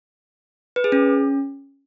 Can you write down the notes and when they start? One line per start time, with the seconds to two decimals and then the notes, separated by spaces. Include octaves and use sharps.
0.76 B4
0.84 G#4
0.92 C#4